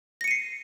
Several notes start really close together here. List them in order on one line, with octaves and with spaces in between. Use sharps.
A#6 C#7 D#7 C7